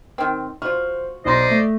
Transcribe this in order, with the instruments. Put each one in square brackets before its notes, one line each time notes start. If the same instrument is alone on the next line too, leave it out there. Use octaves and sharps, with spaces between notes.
[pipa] D#3 C4
[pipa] F4 F#4 [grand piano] C5 F6
[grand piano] B1 C6 A#6 [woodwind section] C5 D5 D#5
[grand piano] A3